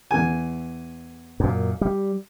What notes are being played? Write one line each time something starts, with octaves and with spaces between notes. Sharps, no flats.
E2 G#5
F#2 A#2
G3